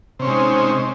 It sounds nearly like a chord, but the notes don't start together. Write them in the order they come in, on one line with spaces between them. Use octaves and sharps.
C3 C#4 C4 G#3 D#4